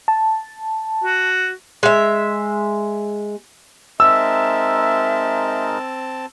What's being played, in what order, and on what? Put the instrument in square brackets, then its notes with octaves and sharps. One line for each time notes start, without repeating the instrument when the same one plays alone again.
[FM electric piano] A5
[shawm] F#4
[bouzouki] G#3 E5
[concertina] G#3 D#4 A#4 [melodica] C4 A5 [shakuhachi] E5 [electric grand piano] E6